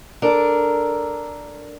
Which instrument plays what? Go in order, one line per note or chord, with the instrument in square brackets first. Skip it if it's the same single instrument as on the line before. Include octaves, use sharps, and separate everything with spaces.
[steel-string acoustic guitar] D4 A4 A#4